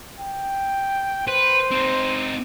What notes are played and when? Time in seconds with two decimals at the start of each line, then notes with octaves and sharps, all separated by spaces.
0.20 G5
1.28 B4 C5
1.71 C4 D#4